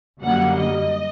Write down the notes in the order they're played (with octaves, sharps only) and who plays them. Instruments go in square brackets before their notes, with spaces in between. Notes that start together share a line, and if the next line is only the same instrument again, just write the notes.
[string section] F#2 D3 G3 A#3 F#5
D#5